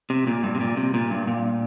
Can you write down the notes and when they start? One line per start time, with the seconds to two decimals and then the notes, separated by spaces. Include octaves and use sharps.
0.10 C3
0.27 A#2
0.43 G2
0.55 C3
0.60 A#2
0.77 C3
0.94 A#2
1.10 G2
1.27 A#2